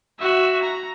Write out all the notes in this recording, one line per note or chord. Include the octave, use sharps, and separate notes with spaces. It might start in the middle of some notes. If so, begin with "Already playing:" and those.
F#4 E5
A#5